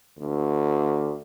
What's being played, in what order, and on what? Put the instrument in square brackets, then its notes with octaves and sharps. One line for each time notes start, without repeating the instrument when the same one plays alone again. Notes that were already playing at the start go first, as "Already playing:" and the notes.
[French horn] D2